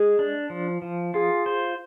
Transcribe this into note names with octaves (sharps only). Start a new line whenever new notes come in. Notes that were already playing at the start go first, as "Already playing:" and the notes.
Already playing: G#3 G#4
D4
F3
F3
F4 G#4
C5